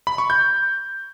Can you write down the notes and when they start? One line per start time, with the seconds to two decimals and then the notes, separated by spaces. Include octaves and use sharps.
0.07 B5
0.18 C#6
0.30 G6